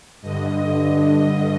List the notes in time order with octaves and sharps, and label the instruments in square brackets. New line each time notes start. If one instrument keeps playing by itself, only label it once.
[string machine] G2 D3 D#5